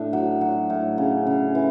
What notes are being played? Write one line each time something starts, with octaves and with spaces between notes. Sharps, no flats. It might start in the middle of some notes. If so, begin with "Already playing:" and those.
Already playing: A2 D4
F#3
F#3
A2
C#3
C#3
E3